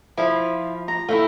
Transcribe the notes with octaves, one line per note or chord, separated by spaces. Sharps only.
F3 E4 F5 B5
A#5
A3 E4 F5 G5